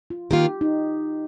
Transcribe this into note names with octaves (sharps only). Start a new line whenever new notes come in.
F4
D#3 A#3 F4 G4
D#4